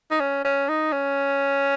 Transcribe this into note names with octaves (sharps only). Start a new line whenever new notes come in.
D#4
C#4
C#4
D#4
C#4